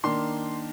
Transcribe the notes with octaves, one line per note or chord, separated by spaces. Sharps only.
D#3 A#3 D4 C6